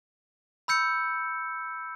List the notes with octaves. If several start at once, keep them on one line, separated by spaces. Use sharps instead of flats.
B5 E6 G6 C#7